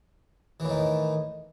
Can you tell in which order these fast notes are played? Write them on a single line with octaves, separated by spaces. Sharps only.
E3 A2 D#3